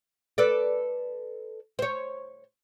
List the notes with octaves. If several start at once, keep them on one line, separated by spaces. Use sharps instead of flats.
A4 B4 D5
C5 C#5